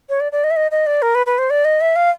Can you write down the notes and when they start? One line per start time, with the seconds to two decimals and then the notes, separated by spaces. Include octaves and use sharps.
0.09 C#5
0.20 D5
0.32 D5
0.44 D#5
0.51 E5
0.56 D#5
0.71 D#5
0.86 D5
1.02 A#4
1.15 B4
1.26 B4
1.38 C5
1.50 D5
1.65 D#5
1.81 E5
1.96 F5